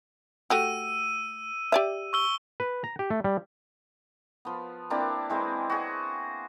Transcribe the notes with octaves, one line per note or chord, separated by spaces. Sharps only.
A3 F#4 G4 E6 D#7
G4 D5 E5
C#6 E6 G7
B4
A#5
G4
A3
G3
F3 B3
A#3 C4 D4 E4
E3 G#3 C4 E4
F#4 G#4